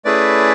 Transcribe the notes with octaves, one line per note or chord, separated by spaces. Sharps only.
A3 C#4 E4 G#4 B4 D5